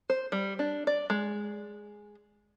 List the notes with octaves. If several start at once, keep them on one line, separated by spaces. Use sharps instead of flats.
C5
G3
D4
D5
G#3